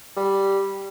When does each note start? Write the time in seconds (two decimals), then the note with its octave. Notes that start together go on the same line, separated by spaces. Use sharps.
0.16 G3